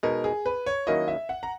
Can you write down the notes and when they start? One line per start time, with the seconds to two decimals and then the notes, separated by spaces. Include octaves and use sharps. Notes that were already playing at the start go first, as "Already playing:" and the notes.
0.03 B2 G#3 D#4 A#4
0.24 G#4
0.46 B4
0.66 C#5
0.87 D#3 F#3 A#3 C#4 E4 D#5
1.08 E5
1.29 F#5
1.43 A#5